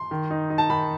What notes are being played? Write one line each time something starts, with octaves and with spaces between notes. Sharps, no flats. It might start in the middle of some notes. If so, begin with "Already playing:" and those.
Already playing: C6
D#3
D#4
D#4
A5
D#3 B5